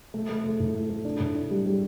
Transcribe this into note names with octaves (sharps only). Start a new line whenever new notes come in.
A3
A3
A3
A2
A3
A3
D4
A2
D4
G3
G3